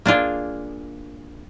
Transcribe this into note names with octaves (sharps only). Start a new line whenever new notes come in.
A#3 D4 F4 G#4